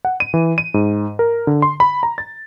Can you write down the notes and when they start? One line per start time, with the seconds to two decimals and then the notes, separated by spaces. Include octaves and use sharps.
0.05 F#5
0.20 D#7
0.34 E3
0.58 D#7
0.74 G#2
1.19 A#4
1.47 D3
1.62 C6
1.80 B5
2.03 A#5
2.18 A6